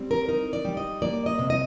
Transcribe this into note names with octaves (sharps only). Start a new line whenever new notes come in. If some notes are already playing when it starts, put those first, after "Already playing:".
Already playing: G3 C4
A#4
D#4 A#4
D5
G3
D#5
A#3 D5
D#5
C3
D#5